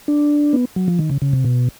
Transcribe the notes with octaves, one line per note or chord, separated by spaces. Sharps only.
D4
B3
F#3
F3
D#3
C#3
C#3
C3
B2